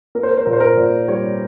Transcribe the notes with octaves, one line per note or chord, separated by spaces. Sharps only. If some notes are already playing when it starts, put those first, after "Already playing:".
A#3 A#4
C5
A#4
C5
A#2 A#4
C5
A#4
A#2
G3 C#5